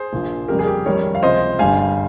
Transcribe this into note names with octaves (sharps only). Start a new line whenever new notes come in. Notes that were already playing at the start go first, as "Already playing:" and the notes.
Already playing: G#4 C5
A#1 A#2 F3
F2 C#3 G3 G4 A#4
G#4
G4
F2 D#3 G3 A#4 C#5
F5
C#2 C3 F3 C5 D#5
G1 G2 G3 F5 G#5